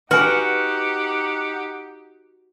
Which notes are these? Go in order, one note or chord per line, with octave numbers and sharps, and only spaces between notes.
D#4 F#4 G4 B4 F#5 G#5